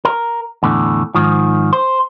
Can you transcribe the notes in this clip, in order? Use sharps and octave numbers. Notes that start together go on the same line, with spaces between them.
A#4
E2 A2 D3
G#2 D#3 F3
C5